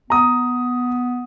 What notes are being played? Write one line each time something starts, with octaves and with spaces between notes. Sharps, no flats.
B3 A#5 D#6